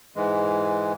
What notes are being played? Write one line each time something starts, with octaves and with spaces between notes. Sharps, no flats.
G#2 E3 G#3